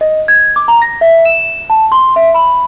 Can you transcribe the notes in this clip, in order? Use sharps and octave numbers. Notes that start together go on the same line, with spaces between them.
D#5
G#6
D6
A#5
A#6
E5
E7
A5
C6
E5
B5